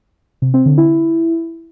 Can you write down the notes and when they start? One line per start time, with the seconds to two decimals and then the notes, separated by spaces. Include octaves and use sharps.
0.42 C3
0.54 C4
0.66 D3
0.78 E4